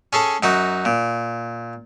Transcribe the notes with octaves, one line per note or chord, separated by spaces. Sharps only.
C#4 G#4 A4
F#2 D#4 F#4
A#2